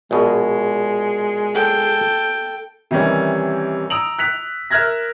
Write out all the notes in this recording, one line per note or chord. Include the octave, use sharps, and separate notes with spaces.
A#1 B2 G#3
A4 G5
C3 D#3 E3 G3 C#4
A#5 D#6 E6 D7 F7 F#7
F#6 B6 F7
A#4 E5 F6 F#6 G#6 A#6